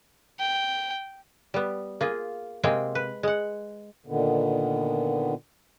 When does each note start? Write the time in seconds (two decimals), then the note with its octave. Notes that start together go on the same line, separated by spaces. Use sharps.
0.39 G5
1.54 G3 B3
2.01 A#3 F4 G#4
2.63 C3 G#3 A#3 C4 G#4 G5
2.95 B4
3.23 G#3 F#5
4.06 A#2 D3 D#3 B3